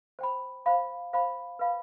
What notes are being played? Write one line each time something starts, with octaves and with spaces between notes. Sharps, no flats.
C5 G5 B5
C5 F5 B5
C5 F5 B5
B4 F5 B5